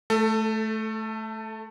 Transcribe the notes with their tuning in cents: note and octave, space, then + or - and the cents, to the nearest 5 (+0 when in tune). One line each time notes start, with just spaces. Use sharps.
A3 -10 A4 +20